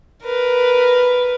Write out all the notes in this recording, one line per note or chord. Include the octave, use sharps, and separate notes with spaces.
A#4 B4